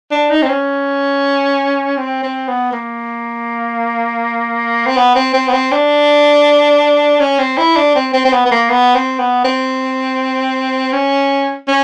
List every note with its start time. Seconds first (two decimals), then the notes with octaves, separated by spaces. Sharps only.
0.11 D4
0.30 D#4
0.42 C4
0.49 C#4
1.98 C4
2.23 C4
2.48 B3
2.72 A#3
4.86 C4
4.96 B3
5.15 C4
5.34 C4
5.48 B3
5.53 C4
5.72 D4
7.20 C#4
7.39 C4
7.58 E4
7.76 D4
7.95 C4
8.13 C4
8.25 C4
8.33 B3
8.46 B3
8.51 A#3
8.70 B3
8.95 C4
9.19 B3
9.44 C4
10.93 C#4
11.68 C#4